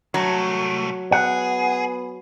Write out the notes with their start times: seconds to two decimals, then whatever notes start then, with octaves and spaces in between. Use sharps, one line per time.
0.14 C2 F#3 A3
1.12 B3 G#4 F#5